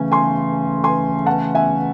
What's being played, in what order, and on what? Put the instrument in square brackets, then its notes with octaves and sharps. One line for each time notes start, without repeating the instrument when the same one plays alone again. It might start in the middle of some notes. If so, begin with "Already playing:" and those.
Already playing: [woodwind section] C#3 E3 A3 C#4 [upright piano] G#5
[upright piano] G#5 C6
G#5 C6
F#5 A5
E5 G#5